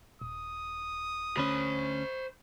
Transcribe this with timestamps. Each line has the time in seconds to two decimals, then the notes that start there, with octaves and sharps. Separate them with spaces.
0.21 D#1 D#6
1.37 D2 C#4 C5 B5